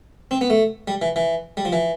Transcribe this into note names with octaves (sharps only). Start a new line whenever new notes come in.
C4
B3
A3
G3
E3
E3
G3
F3
E3